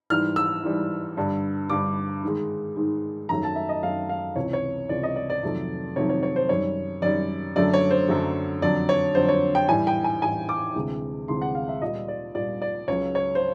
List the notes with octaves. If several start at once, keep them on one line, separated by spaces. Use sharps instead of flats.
G#2 E3 G3 F6
E6
G#2 E3 G3
G2 D3 G3
G2 D3 G3 D6
G#2 D#3 G#3
G#2 D#3 G#3
F#2 D#3 F#3 A3 A#5
A5
E5
D#5
F#2 D#3 F#3 A3 F5
F5
C#2 C3 E3 C#5
C#5
C#2 C3 E3 D5
D#5
D5
D5
F2 C3 D#3 F#3 A3
F2 C3 D#3 F#3 A3 C#5
C#5
C#5
C5
F#2 D#3 G3 C#5
F#2 D#3 G3 D5
F#2 D3 F#3 A3 D5
C#5
C5
F#2 D3 F#3 A3
F2 D3 F#3 D5
C#5
F2 D3 F#3 C5
C#5
G5
A2 E3 G3 G#5
G5
G#5
A2 E3 G3 G#5
D6
D2 C3 E3 G#3
D2 C3 E3 G#3 C6
F#5
F5
E5
A#2 G3 D#5
D5
A#2 G3 D5
D5
C#2 C#3 F#3 C#5
C#5
C5